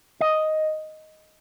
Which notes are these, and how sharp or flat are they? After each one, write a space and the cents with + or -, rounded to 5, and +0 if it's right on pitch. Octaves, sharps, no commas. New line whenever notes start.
D#5 +5